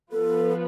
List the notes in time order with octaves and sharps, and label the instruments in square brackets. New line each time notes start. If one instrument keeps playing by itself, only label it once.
[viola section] F3 B3 F4 B4 [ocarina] A4